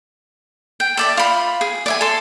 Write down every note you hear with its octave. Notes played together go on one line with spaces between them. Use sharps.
G5
A4 D5 E5
F4 B5
G#4
D5 E5 G#5
A4 C6